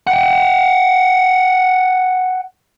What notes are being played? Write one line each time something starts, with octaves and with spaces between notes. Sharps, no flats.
F#5 G5